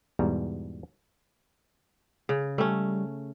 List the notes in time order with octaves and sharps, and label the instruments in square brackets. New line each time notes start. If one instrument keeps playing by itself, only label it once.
[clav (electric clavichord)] E2 G#2 B2 G3 A#5
[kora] C#3
[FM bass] G3 [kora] A3 C#4